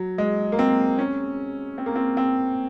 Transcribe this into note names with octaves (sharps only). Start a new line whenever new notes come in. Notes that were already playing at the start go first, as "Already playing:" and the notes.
Already playing: F#3
G#3
A#3
C4
C#4
C4
A#3
C4
C4